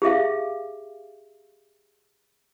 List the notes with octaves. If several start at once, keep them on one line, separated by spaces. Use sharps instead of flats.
G4 G#4 E5 F5